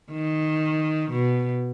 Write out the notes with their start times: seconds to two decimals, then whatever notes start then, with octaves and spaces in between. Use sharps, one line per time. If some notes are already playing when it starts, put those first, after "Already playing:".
0.12 D#3
1.11 B2